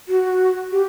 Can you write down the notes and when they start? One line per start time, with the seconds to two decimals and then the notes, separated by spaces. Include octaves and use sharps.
0.08 F#4
0.72 G4